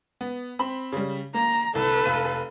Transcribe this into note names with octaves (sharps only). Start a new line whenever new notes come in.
B3
C4 B5
C#3 G3
A#3 A#5
C2 A4 B4
F1 F5 D#7